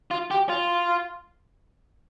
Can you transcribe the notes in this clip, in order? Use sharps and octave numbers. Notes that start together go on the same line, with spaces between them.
F4
G4
F4